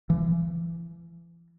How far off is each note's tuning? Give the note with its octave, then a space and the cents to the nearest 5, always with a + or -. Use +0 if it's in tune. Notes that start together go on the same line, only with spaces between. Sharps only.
E3 +40